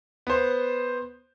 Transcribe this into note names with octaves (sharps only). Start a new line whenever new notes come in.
B3 C5